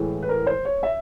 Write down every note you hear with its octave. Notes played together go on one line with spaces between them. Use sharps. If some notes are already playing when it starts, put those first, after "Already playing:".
Already playing: A2 E3 G#3
B4
A#4
C5
C#5
E5